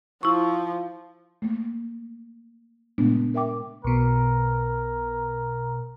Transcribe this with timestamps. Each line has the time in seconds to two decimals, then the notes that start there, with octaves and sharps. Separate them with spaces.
0.23 F3 E4 C#6
1.42 A3 A#3
2.98 A#2 C#3 G#3 A3 B3 D4
3.34 A#4 E5 G5 D6
3.84 B1 B2 A#4